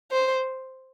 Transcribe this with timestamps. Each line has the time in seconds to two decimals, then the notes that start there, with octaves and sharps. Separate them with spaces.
0.12 C5